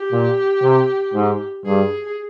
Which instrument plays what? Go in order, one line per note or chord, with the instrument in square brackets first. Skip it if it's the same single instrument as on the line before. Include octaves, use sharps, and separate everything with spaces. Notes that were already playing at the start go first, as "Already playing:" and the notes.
Already playing: [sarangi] G4
[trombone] A#2
C3
G#2
[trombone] G2 [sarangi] G#4